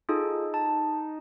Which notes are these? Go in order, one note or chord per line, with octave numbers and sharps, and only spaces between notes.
D#4 F4 G#4 A4
A5